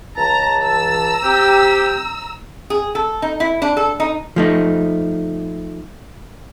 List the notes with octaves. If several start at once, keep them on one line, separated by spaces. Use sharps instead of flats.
C#2 E3 A5 A#5
A#5 E6
C4 G4
G#4
A4
D#4
E4
D4
A4
D#4
F3 A3 D#4